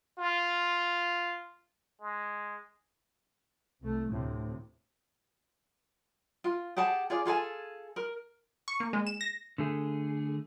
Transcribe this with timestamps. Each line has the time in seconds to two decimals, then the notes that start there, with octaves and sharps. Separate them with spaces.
0.18 F4
2.01 G#3
3.83 C2 A3
4.12 D2 A2 C3
6.44 F4
6.77 G4 G#4 F#5 A5
7.10 F4 G#4 D5
7.25 F4 G#4 A4 G#5
7.96 A#4
8.68 C#6
8.80 A#3
8.93 G#3
9.07 E7
9.21 A#6
9.58 D3 A3 G#4